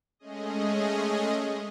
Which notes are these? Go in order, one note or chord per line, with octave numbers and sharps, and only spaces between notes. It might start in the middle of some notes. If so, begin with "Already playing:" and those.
G#3 A3 C#4 G#4 D#5